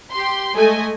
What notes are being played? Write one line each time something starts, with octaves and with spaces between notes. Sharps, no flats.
G4 C6
G#3 A3 D#5 G#5